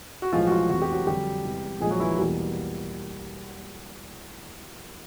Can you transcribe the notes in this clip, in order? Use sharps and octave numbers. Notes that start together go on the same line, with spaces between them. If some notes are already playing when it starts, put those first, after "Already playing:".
F#4
B1 A2 E3 F3 G#3 F4
F#4
F3 F4
F1 E2 C3 E3 F#4
G4
F#3 F#4
F2 D3 F#3 G3 G4
E2 C3 E3 G#3
A#1 A#2 F3 G#3 A3 G#4
F#3 F#4
E3 E4
E2 B2 G3 A#3